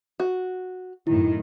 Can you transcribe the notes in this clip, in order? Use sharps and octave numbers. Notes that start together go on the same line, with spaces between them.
F#4
F#2 A2 D#3 E4